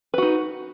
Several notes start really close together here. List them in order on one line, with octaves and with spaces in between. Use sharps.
B4 F#4 D#4